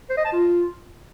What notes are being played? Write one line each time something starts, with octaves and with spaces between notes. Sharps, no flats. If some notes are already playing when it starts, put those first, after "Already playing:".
C5
D#5
A5
F4